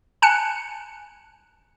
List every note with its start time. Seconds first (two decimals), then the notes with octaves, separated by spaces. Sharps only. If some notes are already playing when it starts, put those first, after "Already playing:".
0.22 G#5 A5 F#6 C#7